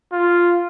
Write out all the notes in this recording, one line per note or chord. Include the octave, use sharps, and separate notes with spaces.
F4